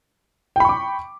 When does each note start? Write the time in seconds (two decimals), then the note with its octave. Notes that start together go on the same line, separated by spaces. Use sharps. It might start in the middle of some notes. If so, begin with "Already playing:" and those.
0.56 G5
0.60 B5
0.65 C#6
0.69 D6